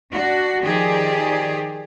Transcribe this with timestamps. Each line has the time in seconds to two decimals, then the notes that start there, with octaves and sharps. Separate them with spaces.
0.12 D4 F#4
0.61 D#3 F3 G4 G#4 D5